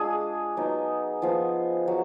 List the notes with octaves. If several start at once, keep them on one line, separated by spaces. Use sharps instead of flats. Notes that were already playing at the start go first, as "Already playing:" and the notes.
Already playing: G#3 D4 F4 G#4
F#3 B3 D#4
F3 B3 F4
F#3